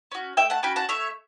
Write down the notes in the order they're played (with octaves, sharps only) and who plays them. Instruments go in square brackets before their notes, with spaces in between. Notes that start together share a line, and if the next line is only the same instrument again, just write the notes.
[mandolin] C#4 F#4
A3 E5 G5
F#5 A5
C#4 F#4 G5 B5
F#5 A5
A3 C#5 E5